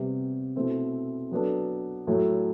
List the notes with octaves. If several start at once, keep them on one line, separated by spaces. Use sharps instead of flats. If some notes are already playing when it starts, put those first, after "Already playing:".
Already playing: C3 G3 B3
B2 A3 C4 E4
F#3 B3 D4 A4
A2 F#3 A3